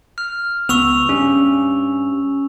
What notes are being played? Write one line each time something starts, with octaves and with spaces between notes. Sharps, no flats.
F6
C#2 B3 C#6 E6 F7
G2 C#4